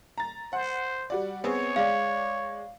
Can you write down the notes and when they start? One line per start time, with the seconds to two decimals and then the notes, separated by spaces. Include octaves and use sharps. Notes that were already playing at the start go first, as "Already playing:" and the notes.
0.18 A#5 A6
0.53 C5 F#5
1.10 G3 F#4 D5
1.44 B3 C4 G#4 C#5
1.76 G#3 D5 F5